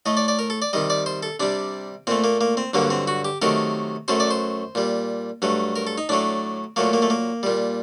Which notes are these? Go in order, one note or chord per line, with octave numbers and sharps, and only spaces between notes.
A2 A3 D#5
D5
D5
A#4
A4
D5
C3 D#3 G3 D#5
D5
C5
A4
C3 G3 D4
A#2 A3 C4
A#3
A#3
C4
G2 D3 F#3 A#3
C4
F#4
G4
C3 D#3 F#3 A3 A#4
F#2 F#3 A3 C5
D5
C5
A#2 G3
G2 F#3 A3
A#4
A4
D#4
A2 F#3 A3 D4
A#2 F#3 A3 A#3
A#3
A3
A#3
A#2 G3